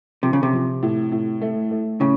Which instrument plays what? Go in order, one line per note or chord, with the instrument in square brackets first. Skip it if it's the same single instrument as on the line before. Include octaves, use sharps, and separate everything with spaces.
[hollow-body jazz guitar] C3 [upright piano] F3
[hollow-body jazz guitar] C#3
C3
[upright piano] F3
A2
A2
A3
A3
[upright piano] A2 [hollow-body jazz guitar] C#3